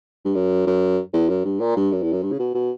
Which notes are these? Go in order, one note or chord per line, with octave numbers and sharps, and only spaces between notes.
G2
F#2
F#2
E2
F#2
G2
A#2
G2
F#2
E2
F#2
G2
C#3
B2
B2